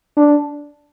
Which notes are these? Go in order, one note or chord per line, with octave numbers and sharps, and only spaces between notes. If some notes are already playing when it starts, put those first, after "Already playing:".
D4